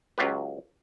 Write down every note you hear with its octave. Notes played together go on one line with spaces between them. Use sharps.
C#2 F#3 F4 G4 B4